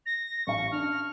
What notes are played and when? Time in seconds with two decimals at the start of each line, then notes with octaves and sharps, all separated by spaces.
0.06 A#6
0.47 A1 F5 C#6
0.72 D4 F6